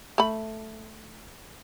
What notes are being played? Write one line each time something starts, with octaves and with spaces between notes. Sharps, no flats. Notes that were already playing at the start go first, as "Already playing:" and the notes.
A3 B5